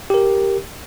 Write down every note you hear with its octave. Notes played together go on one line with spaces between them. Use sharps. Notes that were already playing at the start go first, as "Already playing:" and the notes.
G4 A#4